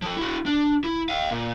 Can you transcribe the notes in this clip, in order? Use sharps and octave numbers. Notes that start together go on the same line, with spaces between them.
F3 A4
E4 F#4
D4
E4
D#5 F5
A#2